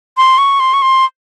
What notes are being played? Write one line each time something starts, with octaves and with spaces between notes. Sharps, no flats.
C6
C#6
C6
C#6
C6